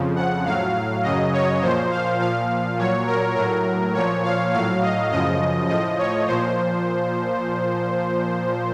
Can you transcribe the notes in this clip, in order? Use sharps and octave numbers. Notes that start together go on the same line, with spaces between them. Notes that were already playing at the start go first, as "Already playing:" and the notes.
Already playing: F2 C#3 F3
F#5
A2 F#3 F5
F#2 C#3 F#3 D#5
C#5
A#2 F3 C5
F5
A#2 F3 F5
A#2 F#3 C#5
A#4
A2 F#3 A#4
A#2 F3 C#5
F5
A2 F#3 F5
D#5
F#2 C#3 F3 D#5
A2 F3 D#5
C#5
A#2 F3 C5